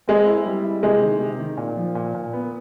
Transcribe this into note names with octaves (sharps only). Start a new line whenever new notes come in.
G#3 C4
E4
G3
E4
C3 G#3
D#3
C3
D#3
A#2
F3
A#2
A#2
B3